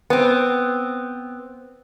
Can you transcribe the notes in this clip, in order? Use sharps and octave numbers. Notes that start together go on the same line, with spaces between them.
B3 C4